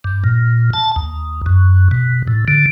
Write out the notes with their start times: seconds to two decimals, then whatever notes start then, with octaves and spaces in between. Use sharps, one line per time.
0.04 G2
0.24 A#2
0.74 A5
0.96 D#2
1.46 F#2
1.91 B2
2.28 A2
2.48 D3